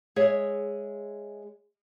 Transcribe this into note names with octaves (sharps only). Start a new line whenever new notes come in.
G#3 G#4 C#5 E5